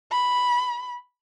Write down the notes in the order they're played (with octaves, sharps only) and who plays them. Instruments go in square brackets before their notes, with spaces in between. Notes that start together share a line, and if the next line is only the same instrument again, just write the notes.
[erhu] B5